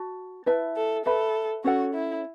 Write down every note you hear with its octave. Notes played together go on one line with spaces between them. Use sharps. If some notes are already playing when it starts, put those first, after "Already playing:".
Already playing: F#4 A5
E4 B4 E5 A5
A4
A4 B4 E5 B5
C#4 F#4 A4 C#5 F#5
E4